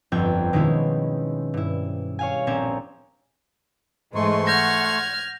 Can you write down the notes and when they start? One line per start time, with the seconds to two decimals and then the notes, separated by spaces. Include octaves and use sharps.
0.12 G1 F2 C4 G5 G#6
0.53 B2 D#3 G#3 C#4 E4
1.54 G2 E4
2.19 C#5 F5 G#5
2.47 A#1 A#3 C4 C#4 G#6 E7
4.15 G#2 E3 G#3 A3 C6 C#6
4.47 F#5 F6 G6 G#6 A#6